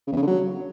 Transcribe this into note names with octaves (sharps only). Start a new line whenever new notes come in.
C#3
E2
C#3
D3
F#3